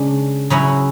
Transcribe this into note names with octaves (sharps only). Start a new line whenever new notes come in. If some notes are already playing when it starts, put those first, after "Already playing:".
Already playing: C#3 G#3 D4
C#3 F#3 C#4 E4